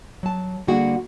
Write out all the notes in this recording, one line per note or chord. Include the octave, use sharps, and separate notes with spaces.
F#3 A5
D3 G3 A#3 F#4 G#4 F#5